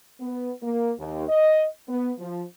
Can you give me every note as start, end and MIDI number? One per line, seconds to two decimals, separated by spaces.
0.20 0.52 59
0.63 0.92 58
0.98 1.26 39
1.28 1.65 75
1.89 2.12 59
2.18 2.43 53